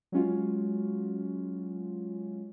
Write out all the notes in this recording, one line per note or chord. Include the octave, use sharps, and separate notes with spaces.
F#3 G#3 C#4 F4 F#4